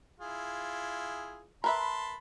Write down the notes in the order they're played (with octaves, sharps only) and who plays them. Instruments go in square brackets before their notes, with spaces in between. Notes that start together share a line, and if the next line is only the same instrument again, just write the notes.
[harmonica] E4 F4 G#4
[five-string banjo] A#4 B4 E5 [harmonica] A5 B5 C6